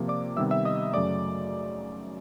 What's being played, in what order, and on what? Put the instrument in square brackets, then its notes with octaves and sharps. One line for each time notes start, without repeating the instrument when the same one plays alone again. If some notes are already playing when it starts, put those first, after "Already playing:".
Already playing: [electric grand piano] C3 F3 A#3
D5 D6
C3 D#3 G3 B3 E5 E6
E5 E6
D#5 D#6
F#2 C#3 F#3 A3 D5 D6